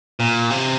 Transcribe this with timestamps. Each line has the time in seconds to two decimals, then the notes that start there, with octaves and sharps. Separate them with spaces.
0.20 A#2
0.50 C3